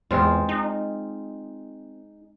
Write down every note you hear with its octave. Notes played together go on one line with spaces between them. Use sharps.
E2 G#3 C4 F4
D#4